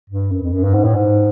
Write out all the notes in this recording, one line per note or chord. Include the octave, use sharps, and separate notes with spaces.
G2
F#2
F2
F#2
G2
G#2
A2
G#2